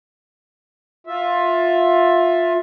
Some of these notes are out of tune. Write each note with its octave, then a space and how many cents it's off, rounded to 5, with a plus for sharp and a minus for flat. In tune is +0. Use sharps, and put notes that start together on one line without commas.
F4 +15 E5 +0